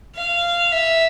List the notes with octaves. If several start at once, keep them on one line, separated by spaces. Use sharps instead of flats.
F5
E5